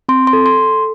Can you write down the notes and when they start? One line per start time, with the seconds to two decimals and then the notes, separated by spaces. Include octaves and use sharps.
0.09 C4 C6
0.27 C6
0.33 A4
0.46 C6
0.58 A4